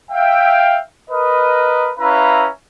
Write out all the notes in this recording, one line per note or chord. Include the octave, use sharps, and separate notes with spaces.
E5 F5 G5
A#4 B4 D#5
C#4 E4 B4 E5 F5 A#5